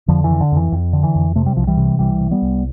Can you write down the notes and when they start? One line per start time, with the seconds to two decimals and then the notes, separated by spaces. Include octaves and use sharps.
0.08 F2 D3 F3
0.24 E3
0.30 D3
0.41 D3
0.52 F2 E3
0.72 F2
0.93 D3
1.03 E3
1.15 F2
1.36 C3 A3
1.46 G3
1.56 C2 F3
1.67 E3 G3
1.77 C3
1.99 C2 E3 G3
2.20 C3
2.31 G3 B3
2.42 C2